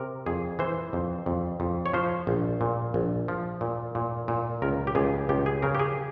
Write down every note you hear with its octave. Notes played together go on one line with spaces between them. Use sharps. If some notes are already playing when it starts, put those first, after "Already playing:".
Already playing: C3 A#4
F2 G#4
E3 C5
F2
F2
F2
C#5
F3 C5
A#1
A#2
A#1
F3
A#2
A#2
A#2
C#2 A#4
G4
C#2 G#4
C#2 G4
G#4
C#3 A#4
G4
G#4